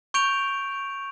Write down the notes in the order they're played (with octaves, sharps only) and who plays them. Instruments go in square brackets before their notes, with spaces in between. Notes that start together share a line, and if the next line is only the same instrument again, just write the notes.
[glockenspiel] C#6 G6 D7 F7